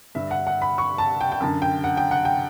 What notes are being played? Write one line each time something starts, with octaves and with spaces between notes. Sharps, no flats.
G2 D3 E5
F#5
F#5
B5
C#6
A5
G5
G5
F#2 D3 A5
G5
F#5
G5
F#5
G5